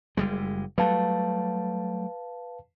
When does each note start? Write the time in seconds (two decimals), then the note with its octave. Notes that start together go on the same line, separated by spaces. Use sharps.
0.17 F#1 G3 G#3
0.78 F#3 G3 A3 B4 F5 A5